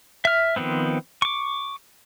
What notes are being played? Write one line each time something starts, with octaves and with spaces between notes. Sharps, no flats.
E5 F6
D#3 F3 B3 C4
C#6 D6